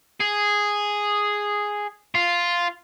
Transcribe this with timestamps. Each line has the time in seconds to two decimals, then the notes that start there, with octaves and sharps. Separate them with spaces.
0.20 G#4
2.15 F4